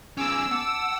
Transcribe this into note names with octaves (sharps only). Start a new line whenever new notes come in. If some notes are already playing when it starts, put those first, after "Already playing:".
B3 C#4 F4 G#4 D6 E6
F#5 A5 D6